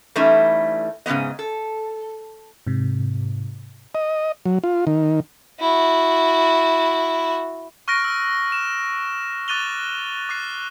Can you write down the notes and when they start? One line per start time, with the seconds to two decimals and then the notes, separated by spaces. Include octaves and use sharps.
0.16 E3 G3 A3 C#4 D#4 E4
1.06 G#2 C#3 E3 B3 D#5
1.39 A4
2.67 G#2 C3
3.95 D#5
4.46 F#3
4.64 F4
4.87 D#3
5.60 E4 F#4
7.88 C#6 F6 F#6 A#6 D7
8.04 E6 F6
8.52 E7
9.48 D6 F#6 A6 D#7 F7 G7
10.29 D6 F#6 C7